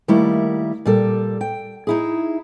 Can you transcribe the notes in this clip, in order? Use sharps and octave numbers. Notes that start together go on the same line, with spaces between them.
D#3 G3 A3 A#3 E4
A#2 G3 A4
G5
D#4 E4 G#4